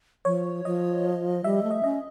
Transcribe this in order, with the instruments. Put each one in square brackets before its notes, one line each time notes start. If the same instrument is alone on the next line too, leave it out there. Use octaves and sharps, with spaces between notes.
[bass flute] F3 [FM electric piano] C#5
[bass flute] F3 [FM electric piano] D#5
[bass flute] G3 [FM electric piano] E5
[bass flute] A3
[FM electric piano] D#5
[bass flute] C#4 [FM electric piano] D#5